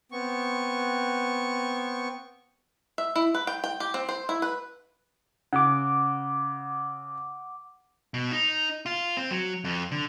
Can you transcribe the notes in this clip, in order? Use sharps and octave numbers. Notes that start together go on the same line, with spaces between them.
B3 C4 C#6
E5
E4
B4
G5
G5
G4
C4
C5
E4
B4
C#3 F#5 D6
B2
D#4
F4
C4
F#3
F2
D3